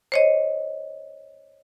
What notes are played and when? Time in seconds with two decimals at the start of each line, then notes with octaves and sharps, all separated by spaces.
0.12 C5 C#5 D#5